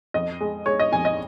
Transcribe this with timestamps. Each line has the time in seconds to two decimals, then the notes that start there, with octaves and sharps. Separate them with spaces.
0.14 F2 D#5
0.41 G#3
0.66 G#3 C#5
0.79 D#5
0.92 F2 G#5
1.05 D#5